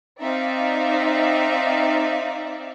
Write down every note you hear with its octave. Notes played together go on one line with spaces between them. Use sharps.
C4 D#4 D5 E5 F5